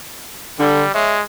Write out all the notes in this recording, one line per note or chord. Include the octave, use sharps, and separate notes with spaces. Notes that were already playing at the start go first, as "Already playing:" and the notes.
D3 G3
G#3 C#5 E5